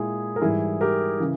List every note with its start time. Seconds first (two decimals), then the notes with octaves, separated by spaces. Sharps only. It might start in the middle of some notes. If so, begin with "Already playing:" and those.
Already playing: A#2 G#3 E4 G#4
0.36 A#4
0.42 G#2 E3 G3 E4 G#4
0.81 G4 A#4
1.20 C#3 E3